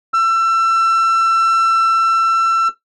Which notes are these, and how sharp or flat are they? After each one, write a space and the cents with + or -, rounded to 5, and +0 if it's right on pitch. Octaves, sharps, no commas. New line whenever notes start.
E6 +30